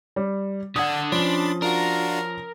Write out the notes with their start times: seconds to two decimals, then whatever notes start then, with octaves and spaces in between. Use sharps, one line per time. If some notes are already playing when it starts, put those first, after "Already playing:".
0.16 G3
0.76 D3 D4 F#5 D#6 G#6
1.12 F3 C#4 D4 B5 C6 A6
1.62 D4 F4 F#4 A#4